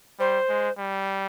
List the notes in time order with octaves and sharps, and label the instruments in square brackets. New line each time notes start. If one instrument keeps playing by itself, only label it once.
[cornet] G3 [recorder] C5
[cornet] G#3
G3